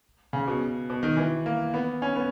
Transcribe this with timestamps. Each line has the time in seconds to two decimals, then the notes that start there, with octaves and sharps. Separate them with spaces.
0.33 C#3
0.47 B2
0.90 B2
1.03 D#3
1.17 E3
1.46 A#3
1.74 B3
2.02 C#4
2.16 B3